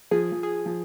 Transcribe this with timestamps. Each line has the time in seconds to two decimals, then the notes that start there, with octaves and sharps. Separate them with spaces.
0.11 F3 G#4
0.32 F3
0.43 G#4
0.66 F3